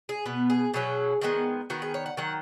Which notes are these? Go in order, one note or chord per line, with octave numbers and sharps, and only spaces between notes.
G#4
B2 B3 B4
G#4
B2 F#3 C#4 G#4
D#3 G#3 B3 F#4
D#3 B3 F#4
G#4
C#5
F#5
D#3 F#3 F#5